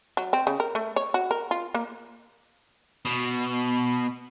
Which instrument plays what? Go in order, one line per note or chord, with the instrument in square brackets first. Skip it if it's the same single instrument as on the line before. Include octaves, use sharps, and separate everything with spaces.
[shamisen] F#3
C4
C#3
A#4
A3
C#5
F#4
A#4
F4
A#3
[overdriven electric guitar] B2